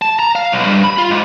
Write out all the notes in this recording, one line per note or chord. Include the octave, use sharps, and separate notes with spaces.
A5
A#5
F5
B1
G2
B5
F4
G#2